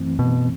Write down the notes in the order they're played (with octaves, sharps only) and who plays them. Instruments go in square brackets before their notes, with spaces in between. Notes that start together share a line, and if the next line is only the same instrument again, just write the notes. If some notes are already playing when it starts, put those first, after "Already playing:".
Already playing: [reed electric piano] F#2 E3 A3 C4
[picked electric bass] B2